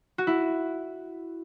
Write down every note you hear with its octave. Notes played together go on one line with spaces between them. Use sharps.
F#4
E4